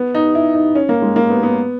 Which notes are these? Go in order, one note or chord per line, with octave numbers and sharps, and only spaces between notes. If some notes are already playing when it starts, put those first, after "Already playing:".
Already playing: B3
D#4
E4
D#4
C#4
A#3
G#3
A#3
B3
B3